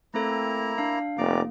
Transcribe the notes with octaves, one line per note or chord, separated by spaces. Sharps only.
A3 A#3 C4 E4 A4 A#5
D4 F5
F1 A#3 D5 A#5 D6